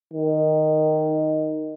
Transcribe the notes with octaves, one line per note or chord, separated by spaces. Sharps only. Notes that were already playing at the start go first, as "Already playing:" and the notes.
D#3